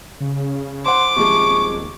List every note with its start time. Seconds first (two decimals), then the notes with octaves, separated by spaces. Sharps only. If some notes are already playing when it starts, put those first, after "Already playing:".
0.20 C#3
0.86 C5 F#5 C6 D6
1.16 D#1 C3 F3 G#3 C#6